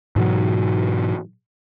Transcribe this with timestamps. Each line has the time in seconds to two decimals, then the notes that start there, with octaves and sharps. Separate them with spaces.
0.16 G#2 B2 E3 F#3